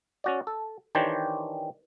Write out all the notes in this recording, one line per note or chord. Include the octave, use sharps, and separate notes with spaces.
C#4 F#4 D5
A4
D#3 E3 D4 G4 C5 C#5